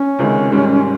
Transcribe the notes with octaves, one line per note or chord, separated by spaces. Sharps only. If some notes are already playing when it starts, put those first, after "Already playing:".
Already playing: C#4
C#2 C3 D#3 G#3
G#2 D#3 G3